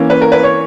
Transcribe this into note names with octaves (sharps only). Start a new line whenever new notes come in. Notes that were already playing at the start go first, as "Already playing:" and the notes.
Already playing: E3 A#3 C#4
B4
A#4
B4
C#5